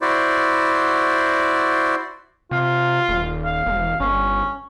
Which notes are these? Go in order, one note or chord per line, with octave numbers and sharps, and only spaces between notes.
E4 F#4 C5 D5
C3 F4
D#1
F5
E1
G1 C#4